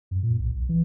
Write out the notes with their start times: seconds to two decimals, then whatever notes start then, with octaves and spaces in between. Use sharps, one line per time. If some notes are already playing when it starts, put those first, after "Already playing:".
0.11 F#2
0.22 A#2
0.39 B1
0.51 B1
0.69 E3